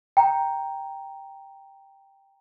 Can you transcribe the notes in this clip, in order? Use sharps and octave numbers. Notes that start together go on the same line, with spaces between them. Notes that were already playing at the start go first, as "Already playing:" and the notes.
G5 A#5